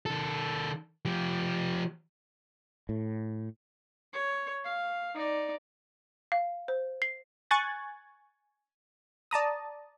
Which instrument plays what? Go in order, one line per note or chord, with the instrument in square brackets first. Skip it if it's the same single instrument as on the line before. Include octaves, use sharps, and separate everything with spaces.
[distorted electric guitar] D#3 A4
F3 G4
[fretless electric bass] A2
[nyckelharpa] C#5
F5
D#4 D5
[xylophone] F5
C5
C7
[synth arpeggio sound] G#5 C#6 F#6 G#6 A6
D5 A5 A#5 D#6